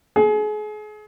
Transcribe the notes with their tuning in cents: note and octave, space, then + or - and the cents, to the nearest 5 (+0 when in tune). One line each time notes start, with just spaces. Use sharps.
G#4 +35